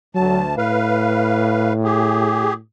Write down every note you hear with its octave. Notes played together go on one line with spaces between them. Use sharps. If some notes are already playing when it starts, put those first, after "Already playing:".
D2 F#3 A5
A2 B4 F5
G4 G#4